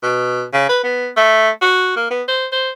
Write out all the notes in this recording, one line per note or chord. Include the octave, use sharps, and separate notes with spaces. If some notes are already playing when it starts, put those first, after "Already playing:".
B2
C#3
B4
B3
A3
F#4
A#3
B3
C5
C5